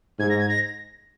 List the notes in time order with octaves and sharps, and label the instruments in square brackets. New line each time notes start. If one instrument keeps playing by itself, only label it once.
[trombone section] G#2 [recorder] G#6
[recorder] A#6
G#6
A#6